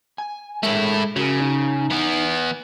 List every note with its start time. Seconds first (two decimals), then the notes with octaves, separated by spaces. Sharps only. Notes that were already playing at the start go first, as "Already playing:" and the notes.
0.18 G#5
0.63 G#3 A3 E4 A#4 C#5
1.16 C#3 F#4 A#4
1.40 D#4
1.90 E3 B3